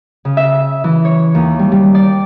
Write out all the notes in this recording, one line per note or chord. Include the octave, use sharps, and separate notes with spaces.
C#3
E5
E3
C#5
D#2
G3
G3
D5